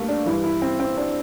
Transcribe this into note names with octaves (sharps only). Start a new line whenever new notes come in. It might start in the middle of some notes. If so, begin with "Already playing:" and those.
Already playing: G2 D3 G3 A3 A#3
D4
G2 E3 E4
E4
C4
C4
D4